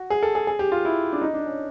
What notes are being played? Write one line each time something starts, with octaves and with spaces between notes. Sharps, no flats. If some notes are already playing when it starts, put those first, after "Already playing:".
Already playing: F#4
G#4
A4
G#4
G#4
G4
F4
E4
D4
D#4
D4
C#4